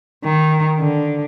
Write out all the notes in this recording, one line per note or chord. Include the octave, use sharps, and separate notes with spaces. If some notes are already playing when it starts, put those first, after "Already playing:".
D#3
D3